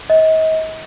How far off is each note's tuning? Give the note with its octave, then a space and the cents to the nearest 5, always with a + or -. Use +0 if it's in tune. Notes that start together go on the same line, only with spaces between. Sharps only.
D#5 +35